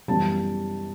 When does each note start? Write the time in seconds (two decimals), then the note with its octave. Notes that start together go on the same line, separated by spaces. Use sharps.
0.08 F#2 E3 G3 B3 A5